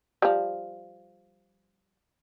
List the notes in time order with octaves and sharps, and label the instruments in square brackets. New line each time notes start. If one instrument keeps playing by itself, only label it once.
[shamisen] F3 G3